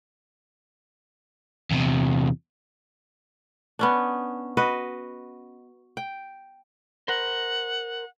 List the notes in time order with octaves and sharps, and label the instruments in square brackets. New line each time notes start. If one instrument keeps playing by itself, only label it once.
[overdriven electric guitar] E2 C3
[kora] B3 C#4 D4
F#4 B4 D#5
G5
[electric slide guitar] A#4 C5 [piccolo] F#5